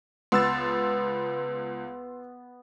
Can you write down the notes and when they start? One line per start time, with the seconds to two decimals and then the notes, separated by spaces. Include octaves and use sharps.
0.32 C#2 B3 C6 E6 A6